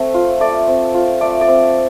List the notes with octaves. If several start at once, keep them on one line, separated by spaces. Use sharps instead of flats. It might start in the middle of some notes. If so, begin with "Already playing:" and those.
Already playing: A3 C4
F4
A3 D5
C4
F4
A3 D5
D5
C4